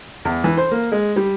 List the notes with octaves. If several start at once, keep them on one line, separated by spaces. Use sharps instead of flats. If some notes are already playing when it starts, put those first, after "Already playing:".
E2
E3
C5
A#3
G#3
G3